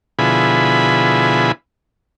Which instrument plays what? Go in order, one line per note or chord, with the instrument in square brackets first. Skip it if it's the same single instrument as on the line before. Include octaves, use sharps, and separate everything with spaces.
[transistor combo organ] B2 D3 F3 E4 G#4 B5